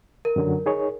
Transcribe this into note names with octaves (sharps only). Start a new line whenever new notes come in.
A#4
F#2 D3 F#3
D#4 G#4 C#5